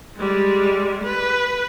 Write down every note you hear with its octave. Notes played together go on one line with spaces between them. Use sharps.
G3 G#3
B4